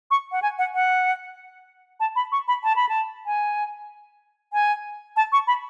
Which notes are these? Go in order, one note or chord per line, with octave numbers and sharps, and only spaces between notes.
C#6
F#5
G#5
F#5
F#5
A5
B5
C#6
B5
A5
B5
A5
G#5
G#5
A5
C#6
B5